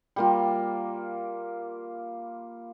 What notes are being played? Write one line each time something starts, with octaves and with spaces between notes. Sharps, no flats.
G3 A#3 F4